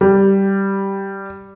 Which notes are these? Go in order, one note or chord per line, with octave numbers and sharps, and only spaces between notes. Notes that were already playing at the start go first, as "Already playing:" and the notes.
G3